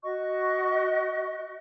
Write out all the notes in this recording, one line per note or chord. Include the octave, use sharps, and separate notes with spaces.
F#4 D#5 C#6